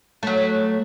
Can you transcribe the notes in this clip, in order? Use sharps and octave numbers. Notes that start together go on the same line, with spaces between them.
F#3 A3